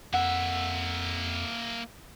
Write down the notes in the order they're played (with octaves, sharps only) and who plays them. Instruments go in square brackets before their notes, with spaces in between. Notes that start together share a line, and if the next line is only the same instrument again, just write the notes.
[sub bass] F2 [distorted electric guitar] A#3 E5 [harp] F#5